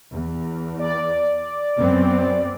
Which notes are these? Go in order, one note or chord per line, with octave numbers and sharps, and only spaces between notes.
E2
D5
F#2 B3 C4